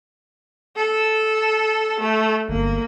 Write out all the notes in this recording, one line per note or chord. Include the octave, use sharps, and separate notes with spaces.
A4
A3
G1 A#3